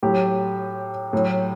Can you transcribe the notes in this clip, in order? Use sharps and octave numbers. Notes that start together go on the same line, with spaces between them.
A2 F#3 G4
A2 F#3